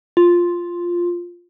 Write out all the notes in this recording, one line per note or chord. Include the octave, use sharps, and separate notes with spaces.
F4